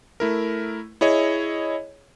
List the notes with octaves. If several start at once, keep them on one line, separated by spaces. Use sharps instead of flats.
A3 E4 A#4
E4 G#4 C#5 D#5